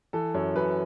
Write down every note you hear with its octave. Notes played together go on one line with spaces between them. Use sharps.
E3 A4
F#2 C#5
F#2 B4